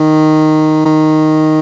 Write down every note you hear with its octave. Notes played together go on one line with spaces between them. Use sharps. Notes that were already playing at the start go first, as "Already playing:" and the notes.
Already playing: D#3
D#3